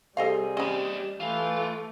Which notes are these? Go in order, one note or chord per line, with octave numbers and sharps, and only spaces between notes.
C3 G3 G#4 A4 D#5 F5
C#4 G4 D#5 B5
E3 A3 F4